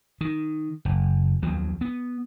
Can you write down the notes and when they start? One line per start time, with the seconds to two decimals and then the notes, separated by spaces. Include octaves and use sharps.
0.21 D#3
0.85 F#1
1.43 D#2 F3 F#3
1.81 B3